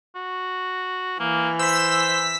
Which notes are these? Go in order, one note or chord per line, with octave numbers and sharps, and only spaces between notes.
F#4
E3 A#3
C5 E6 B6